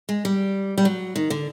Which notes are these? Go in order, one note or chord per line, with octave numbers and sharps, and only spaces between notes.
G#3
G3
G3
F#3
D#3
D3